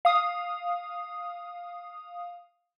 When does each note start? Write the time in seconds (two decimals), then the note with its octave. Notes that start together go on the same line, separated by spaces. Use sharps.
0.05 F5 D#6